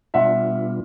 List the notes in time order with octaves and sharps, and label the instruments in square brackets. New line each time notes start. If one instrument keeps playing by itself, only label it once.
[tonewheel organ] B2 G3 B3 D4 F4 [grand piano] E5 F#5